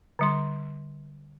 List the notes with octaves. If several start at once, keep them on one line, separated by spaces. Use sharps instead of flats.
D3 G3 C6